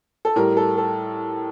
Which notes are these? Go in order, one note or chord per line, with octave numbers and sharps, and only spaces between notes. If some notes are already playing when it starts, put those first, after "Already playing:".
A4
A2 G3 A#4
A4
A4